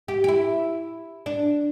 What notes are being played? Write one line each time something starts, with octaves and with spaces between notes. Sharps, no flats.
G4
G4
E4
D4